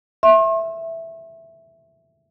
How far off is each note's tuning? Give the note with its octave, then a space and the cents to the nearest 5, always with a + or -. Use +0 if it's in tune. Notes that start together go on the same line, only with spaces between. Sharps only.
E5 +0 C6 +45